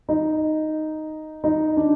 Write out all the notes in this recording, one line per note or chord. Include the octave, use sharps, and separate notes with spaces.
D#4
D#4
D4